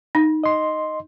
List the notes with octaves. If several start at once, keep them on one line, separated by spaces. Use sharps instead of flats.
D#4
D#5 C6